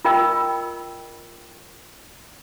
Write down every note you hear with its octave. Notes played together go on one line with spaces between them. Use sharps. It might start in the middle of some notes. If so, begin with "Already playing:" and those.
F4 A#4 D#5 G5 B5 E6